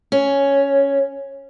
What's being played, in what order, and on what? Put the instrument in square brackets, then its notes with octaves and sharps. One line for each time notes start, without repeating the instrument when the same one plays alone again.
[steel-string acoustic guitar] C#4